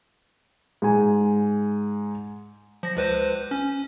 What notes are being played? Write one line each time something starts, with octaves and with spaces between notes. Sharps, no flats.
G#2 G#5
F3 A#6
C#2 B4 C5
C#4